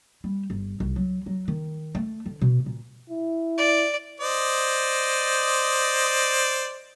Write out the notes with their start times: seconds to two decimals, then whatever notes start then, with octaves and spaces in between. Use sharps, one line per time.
0.24 G3
0.50 G1
0.80 C2
0.96 F#3
1.26 F#3
1.48 D#3
1.95 A3
2.26 D3
2.41 B2
2.66 A#2
3.10 E4
3.58 D5
4.20 C5 D5 D#5